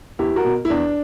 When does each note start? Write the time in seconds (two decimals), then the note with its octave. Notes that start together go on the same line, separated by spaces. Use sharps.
0.19 E2 E4 G4
0.36 F#4 A#4
0.45 B2
0.65 E4
0.70 E2 D4